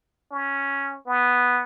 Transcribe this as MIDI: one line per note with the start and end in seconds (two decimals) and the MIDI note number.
0.32 0.96 61
1.06 1.64 59